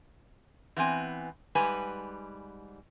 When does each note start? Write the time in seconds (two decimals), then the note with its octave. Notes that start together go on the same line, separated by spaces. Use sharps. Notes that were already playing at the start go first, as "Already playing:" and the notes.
0.76 E3 B3 C4 G#5
1.55 G#2 G3 B4 G#5